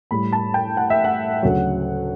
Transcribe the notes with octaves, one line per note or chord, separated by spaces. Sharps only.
A2 G3 B5
A5
G5
F#5
E5
F#5
D2 C#3 F#3